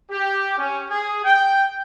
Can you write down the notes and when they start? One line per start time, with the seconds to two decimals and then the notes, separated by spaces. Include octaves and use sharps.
0.10 G4
0.58 C#4
0.89 G#4
1.24 G5